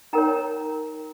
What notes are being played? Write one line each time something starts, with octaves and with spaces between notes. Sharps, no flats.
D#4 A#4 C#5 G5 A#5